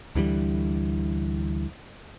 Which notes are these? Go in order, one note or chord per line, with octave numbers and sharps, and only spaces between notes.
D2 D3 E3 G3